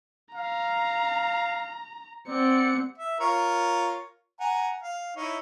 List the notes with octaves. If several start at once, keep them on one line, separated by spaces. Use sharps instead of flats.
F5 A#5
C4 D5 F#5 C#7
E5
F4 A#4 C#5
F#5 G#5 A#5
F5
D#4 E4 C#5